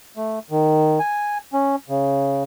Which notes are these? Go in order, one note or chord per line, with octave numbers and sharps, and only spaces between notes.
A3
D#3
G#5
C#4
C#3